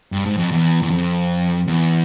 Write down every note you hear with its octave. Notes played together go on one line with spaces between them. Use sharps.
G2
G#2
F2
E2
E2
F2
E2